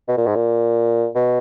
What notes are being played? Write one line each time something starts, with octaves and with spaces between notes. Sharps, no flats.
B2
A#2
G#2
A#2
B2